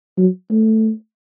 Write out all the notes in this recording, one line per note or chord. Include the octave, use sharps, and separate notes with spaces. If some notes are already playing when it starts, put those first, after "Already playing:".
F#3
A3